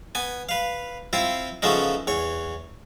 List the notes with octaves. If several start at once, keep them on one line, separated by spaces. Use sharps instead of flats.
B3 G#5
B4 F5
C4 E4 F4
C#3 F3 A3 B3 C#4 D#4
E2 C#5